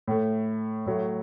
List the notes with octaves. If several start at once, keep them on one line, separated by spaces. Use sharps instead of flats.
A2 A3
A2 F#3 A3